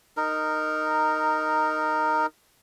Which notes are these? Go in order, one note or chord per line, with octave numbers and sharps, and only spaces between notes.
D#4 A#4